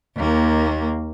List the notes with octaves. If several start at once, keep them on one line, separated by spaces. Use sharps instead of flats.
D#2 A#3